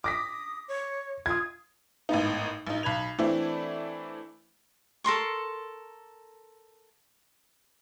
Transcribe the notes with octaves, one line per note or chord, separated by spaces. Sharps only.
D6 D#6 A#6 B6
C#5
F4 D#6 G#6
G#1 A2 B3 D#4
A1 D#4
B1 B5 G#6 F7
E3 A3 C4 D4 E4
A4 A#4 C6 C#6